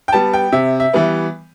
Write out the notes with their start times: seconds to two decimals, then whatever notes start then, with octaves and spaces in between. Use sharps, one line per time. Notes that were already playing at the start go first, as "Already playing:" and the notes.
0.08 G5
0.12 G3 B3 A5
0.33 G5
0.52 C3 E5
0.80 E5
0.93 E3 G3 B3